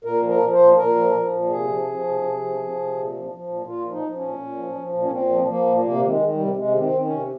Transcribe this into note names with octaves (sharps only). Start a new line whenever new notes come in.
A#2 A#4
F3
A#4
F3
C5
A#2
A#2 A#4
F3
F3
A#2
C3 G#4
F3
F3
C3
C3
F3
F3
C3
A#2
F3
F3
A#2
A#2 F4
F3
D#4
F3
C#4
A#2
A#2
F3
F3
A#2
C#4
A#2 C4
F3
F3 A#3
A#2
C3 A#3
D#3
G#3
D#3
G3
C3
C3 G#3
D#3
C4
D#3
C#4
C3